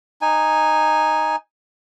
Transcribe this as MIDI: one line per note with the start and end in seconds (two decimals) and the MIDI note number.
0.21 1.36 63
0.21 1.36 80